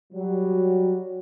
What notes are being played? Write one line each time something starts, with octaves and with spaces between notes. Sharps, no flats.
F#3 G3